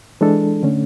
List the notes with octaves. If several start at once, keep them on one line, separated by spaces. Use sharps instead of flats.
E3 G#3 D4 A4
D3 A3 C#4